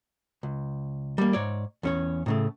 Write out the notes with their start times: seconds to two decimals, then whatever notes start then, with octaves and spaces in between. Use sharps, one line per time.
0.43 C#2
1.18 G3 A#3
1.33 G#2 C#5 D5
1.83 E2 C#4 C#5
2.26 A2 C#3 A3